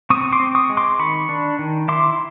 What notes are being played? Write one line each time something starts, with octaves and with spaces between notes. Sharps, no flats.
C4 C#6 D#6
C6 D6
C4
C#6 D#6
G#3
C6 D6
D#3 B5 C#6
D4
D#3
E4 C6 D6